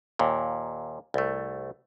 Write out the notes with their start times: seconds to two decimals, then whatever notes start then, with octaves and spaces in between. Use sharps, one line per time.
0.19 D#2 A#2
1.14 C2 A3